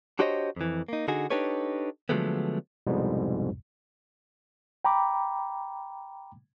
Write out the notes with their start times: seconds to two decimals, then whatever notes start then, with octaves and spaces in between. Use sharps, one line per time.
0.19 D4 F#4 G4 C5 C#5 D#5
0.56 F2 E3
0.88 A#3 D#4
1.08 D3 D#4 F#4 G#4
1.30 D4 D#4 G4 A4 B4 C#5
2.09 D3 F3 F#3 G#3 A3 B3
2.87 C2 F2 G#2 B2 G3
4.85 G5 A#5 B5 D6